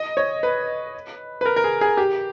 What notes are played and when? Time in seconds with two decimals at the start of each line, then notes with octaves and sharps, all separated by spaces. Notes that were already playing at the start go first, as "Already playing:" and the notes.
Already playing: D#5
0.17 C#5
0.43 B4
1.41 B4
1.46 A#4
1.56 A#4
1.64 G#4
1.81 G#4
1.97 G4